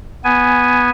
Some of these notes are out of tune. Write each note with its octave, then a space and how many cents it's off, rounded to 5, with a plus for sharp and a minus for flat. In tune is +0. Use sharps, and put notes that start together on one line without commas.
B3 +0 G#5 +0